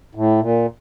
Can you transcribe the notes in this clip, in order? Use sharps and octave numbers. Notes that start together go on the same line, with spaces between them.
A2
A#2